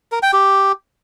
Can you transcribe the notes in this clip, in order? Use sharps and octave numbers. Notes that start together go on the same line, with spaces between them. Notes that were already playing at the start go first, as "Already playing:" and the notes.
A#4
G5
G4